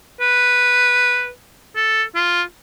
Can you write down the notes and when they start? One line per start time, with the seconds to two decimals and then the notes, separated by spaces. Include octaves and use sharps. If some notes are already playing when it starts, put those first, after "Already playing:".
0.20 B4
1.76 A4
2.15 F4